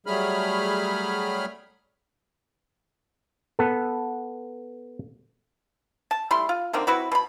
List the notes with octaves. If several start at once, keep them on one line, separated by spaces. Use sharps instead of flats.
F#3 G3 A3 G#4 B5 F6
B3 A4
A5
G3 A3 E4 C6
F4
D3 D#3 A#3 C4
C4 E4 F#4 B4
B2 B5